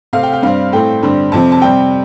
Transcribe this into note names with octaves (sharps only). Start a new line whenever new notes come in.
C3 A3 C4 F5
G5
G5
G2 G3 C4 F5
A2 A3 C4 G5
G2 D3 G3 C4
F2 C3 F3 C4 A5
A5
C3 G3 C4 G5